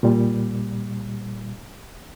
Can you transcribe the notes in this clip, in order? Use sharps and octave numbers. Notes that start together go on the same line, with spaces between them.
A#2 G3